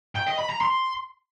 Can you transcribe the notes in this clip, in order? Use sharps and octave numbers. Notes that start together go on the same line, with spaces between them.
G5
D#5
B5
A#5
C6